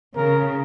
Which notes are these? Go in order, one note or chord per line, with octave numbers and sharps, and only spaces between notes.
C#3 A#4